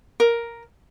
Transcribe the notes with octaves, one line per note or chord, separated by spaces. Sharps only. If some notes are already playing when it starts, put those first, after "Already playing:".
A#4